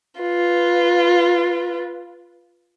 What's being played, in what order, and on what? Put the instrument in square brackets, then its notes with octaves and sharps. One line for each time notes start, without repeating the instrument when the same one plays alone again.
[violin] F4 B4